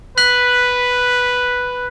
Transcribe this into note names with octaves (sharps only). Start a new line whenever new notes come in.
B4 F#6 B6 F#7